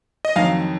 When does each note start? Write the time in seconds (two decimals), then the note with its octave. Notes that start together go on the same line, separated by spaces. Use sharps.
0.25 D#5
0.36 F2 D#3 F#3 F5